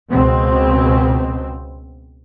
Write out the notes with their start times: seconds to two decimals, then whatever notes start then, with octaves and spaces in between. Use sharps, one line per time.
0.11 C#2 B2 C4